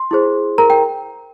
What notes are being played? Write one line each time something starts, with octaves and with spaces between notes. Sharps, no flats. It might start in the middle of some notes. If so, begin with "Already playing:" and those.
Already playing: C6
E4 G#4 C5
A#4 A#5
G5